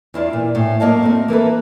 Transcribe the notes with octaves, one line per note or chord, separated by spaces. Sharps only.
E2 E4 F4 D5
A#2
A2
F#2 A#3 D#5 F5 A5
A3 C4
E3 A#3 A4 B4